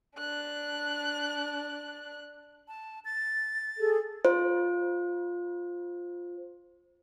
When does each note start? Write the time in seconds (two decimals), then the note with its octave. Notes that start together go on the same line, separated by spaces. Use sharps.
0.17 D4 F#6
2.68 A5
3.05 A6
3.79 G#4 A4
4.25 F4 C5